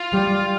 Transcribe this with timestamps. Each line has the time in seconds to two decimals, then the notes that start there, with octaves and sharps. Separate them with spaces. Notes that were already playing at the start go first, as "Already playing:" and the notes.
Already playing: F4
0.12 G3